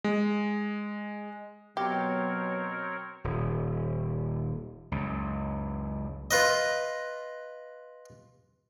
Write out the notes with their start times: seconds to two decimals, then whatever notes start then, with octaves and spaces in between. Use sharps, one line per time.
0.04 G#3
1.77 B2 F#3 C4 G4 A#4 C#5
3.24 D#1
4.92 C#2 F#2
6.31 F4 B4 D#5